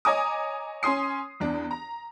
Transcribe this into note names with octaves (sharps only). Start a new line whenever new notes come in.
C#5 D#5 G#5 A#5 D6 D#6
C#4 G#5 C6 D#6 C7
E2 D4
A#5